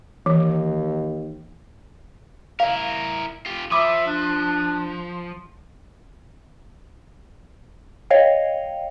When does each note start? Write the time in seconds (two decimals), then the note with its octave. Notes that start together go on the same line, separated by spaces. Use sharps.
0.26 D#2 E3
2.60 E4 A#4 F5
3.46 F4 G4
3.71 F3 E5 B5 D6 D#6
4.07 D4
8.10 C#5 D#5 F5 G5